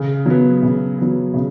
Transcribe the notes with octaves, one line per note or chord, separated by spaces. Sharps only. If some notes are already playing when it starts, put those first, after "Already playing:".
Already playing: C#3
F#3 B3
C#3
F#3 B3
C#3